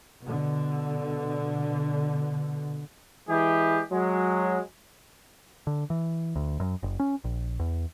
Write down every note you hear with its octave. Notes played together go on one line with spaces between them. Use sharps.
B2 D3
E3 G#3 E4 G4 G#4
F#3 G#3
D3
E3
D2
F#2
F#1
C#4
A#1
E2